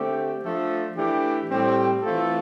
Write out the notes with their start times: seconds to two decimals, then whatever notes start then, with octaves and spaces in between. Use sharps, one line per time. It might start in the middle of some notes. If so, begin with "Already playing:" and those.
Already playing: D3 A3 C4 G4
0.44 F3 A3 D4 A4
0.96 E3 A3 D4 G4
1.49 A2 G3 C4 G4
2.02 E3 A3 C4 F4 A4